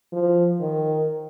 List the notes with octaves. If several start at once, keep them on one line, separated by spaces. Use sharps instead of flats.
F3
D#3